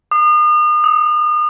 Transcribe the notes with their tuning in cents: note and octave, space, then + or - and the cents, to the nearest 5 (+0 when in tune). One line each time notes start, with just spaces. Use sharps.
D#6 -40
D#6 +15